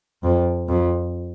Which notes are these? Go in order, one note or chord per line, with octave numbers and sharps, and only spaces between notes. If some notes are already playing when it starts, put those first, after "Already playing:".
F2
F2